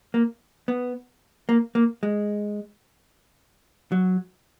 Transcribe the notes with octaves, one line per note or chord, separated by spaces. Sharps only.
A#3
B3
A#3
A#3
G#3
F#3